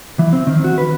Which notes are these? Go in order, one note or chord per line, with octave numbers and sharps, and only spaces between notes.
E3
C4
D#3
F#4
B4